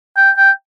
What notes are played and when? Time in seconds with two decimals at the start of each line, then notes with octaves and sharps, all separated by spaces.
0.17 G5
0.37 G5